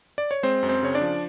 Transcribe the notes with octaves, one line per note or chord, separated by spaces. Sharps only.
D5
C#5
G#3 C4 C5
F#2
C4 C5
C#3 C#5
D4 D5
F3